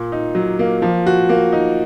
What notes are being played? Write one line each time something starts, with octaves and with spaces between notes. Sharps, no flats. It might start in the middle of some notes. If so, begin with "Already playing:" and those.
Already playing: A#2
D#4
F#3
A#3
F3
F#4
A#3
D#4